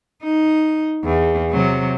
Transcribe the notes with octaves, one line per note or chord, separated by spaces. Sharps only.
D#4
E2
C3 F#3